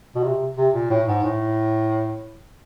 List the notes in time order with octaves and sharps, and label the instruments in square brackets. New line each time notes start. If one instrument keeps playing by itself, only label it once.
[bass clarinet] B2
C3
C3
A#2
A2
G#2
A2